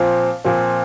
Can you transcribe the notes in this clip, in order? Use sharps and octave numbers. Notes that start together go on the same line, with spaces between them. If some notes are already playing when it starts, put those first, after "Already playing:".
Already playing: A#2 F3 C4
A#2 F3 C4